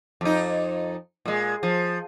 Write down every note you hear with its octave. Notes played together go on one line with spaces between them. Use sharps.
F2 D#4
A#2 G#3
F3